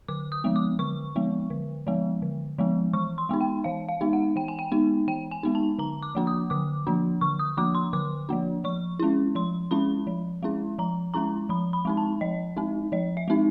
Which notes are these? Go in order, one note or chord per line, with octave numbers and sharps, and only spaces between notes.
D3 D6
D#6
F3 G#3 B3
D6
D3 C#6
F3 G#3 B3
D3
F3 G#3 B3
D3
F3 G#3 B3
E3 C#6
C6
G#3 B3 D#4
G5
E3 F5
F5
G#3 B3 D#4
F#5
E3 G5
G#5
G5
G#3 B3 D#4
E3 G5
G#5
G#3 B3 D#4
A5
D3 A#5
D6
F3 A#3 D4
D#6
D3 D6
F3 A#3 D4
D3 C#6
D#6
F3 A#3 D4 D6
C6
D3 D6
F3 A#3 D4
F3 C#6
G#3 C#4 E4
F3 C6
G#3 C#4 E4 B5
F3
G#3 C#4 E4
F3 A#5
G#3 C#4 E4 A#5
F3 B5
B5
G#3 C4 D#4
A5
F3 D#5
G#3 C4 D#4
F3 D#5
E5
G#3 C4 D#4